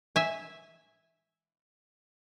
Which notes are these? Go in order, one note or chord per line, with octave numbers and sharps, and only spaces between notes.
E5 G#5